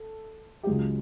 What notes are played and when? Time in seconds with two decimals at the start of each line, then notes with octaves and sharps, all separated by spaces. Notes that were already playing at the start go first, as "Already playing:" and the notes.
Already playing: A4
0.63 G4
0.66 C#2 C#3 F#3 G#3 G#4